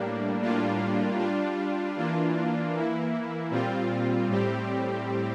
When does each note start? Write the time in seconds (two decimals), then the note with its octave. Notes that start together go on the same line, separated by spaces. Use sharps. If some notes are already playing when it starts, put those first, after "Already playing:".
Already playing: A2 G3 A#3 D4
0.41 A2 G3 A#3 D4 F4
1.19 G3 D4 F4
1.96 E3 A#3 D4 F4
2.73 E3 A#3 E4
3.51 A#2 G3 C4 F4
4.28 A2 G3 C4 G4